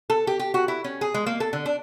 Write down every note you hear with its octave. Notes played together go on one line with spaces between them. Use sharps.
A4
G4
G4
F#4
E4
C#4
G#4
G#3
A#3
A4
D3
D4